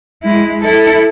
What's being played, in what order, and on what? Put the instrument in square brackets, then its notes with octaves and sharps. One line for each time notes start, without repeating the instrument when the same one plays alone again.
[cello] G#3 E4
E4 A4